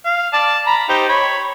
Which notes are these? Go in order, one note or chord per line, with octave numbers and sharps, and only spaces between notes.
F5
D5 A5
A#5 B5
D#4 G4 C5
C#5 B5